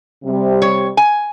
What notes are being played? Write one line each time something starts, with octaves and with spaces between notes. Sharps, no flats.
C3 G3
C#5
G#5